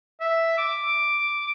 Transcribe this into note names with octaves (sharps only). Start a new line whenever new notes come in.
E5
D6